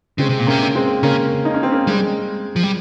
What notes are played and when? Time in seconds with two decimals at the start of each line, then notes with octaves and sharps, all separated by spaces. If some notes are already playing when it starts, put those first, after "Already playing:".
0.18 C#3 G#3 C4
0.29 C3
0.39 A#2
0.47 C3 A#3 C#4
0.63 C#4
0.75 G#3 C4
1.03 C#3 A#3 C#4
1.45 D#4
1.54 C#4
1.63 C4
1.72 A#3 C#4
1.87 G3 G#3 C4
2.56 F3
2.63 G3